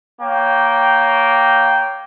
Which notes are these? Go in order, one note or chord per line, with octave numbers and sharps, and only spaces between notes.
A#3 C#5 G5